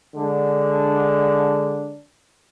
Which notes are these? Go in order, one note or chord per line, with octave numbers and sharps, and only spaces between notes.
D3 G#3 D4